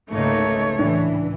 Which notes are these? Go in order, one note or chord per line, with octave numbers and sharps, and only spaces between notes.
G#1 C#2 A3 A#3 D#4 C#5
A2 E3 D4